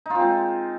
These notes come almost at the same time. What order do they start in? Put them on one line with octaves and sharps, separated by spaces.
D#4 F4 C4 G#3